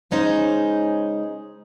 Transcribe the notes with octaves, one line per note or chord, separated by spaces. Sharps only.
C#3 G#3 C#4 D#4 G#4 C5